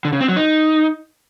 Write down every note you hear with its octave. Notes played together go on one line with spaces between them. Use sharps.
D3
C#3
C4
F#3
D#4